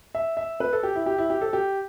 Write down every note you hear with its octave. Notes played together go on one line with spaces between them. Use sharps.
E5
E5
B4
A4
G4
E4
G4
E4
G4
A4
G4